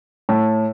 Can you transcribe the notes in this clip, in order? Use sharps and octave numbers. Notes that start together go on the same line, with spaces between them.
A2